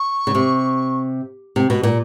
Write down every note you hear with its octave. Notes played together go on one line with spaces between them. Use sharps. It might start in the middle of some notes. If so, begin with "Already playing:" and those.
Already playing: C#6
C#3
C3
C3
B2
A#2